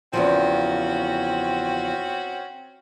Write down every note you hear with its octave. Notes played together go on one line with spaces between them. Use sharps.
E2 C#3 F3 C4 C#4 F#4